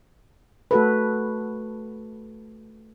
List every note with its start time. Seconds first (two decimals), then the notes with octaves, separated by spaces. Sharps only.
0.71 A3 F#4 A4 B4